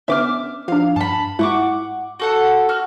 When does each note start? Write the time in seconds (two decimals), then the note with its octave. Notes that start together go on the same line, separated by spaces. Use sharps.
0.08 D3 B3 C#4 E5 D6 F6
0.68 F3 D4 F5
0.96 G2 A5 B5
1.39 G#2 E4 F#5 C#6 D6
2.20 F#4 A4 F#5
2.69 F#4 F6